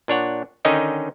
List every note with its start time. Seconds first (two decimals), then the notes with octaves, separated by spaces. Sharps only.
0.08 A#2 D4 C#5 F#5
0.65 D3 D#3 C#4 D#4 D#5 G5